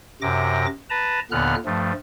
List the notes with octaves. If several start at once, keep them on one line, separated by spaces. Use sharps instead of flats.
F#2 C3 D6 A#6
B4 A5 A#5
D#2 A#2 D3 B3 F6 F#6
G2 F3 A3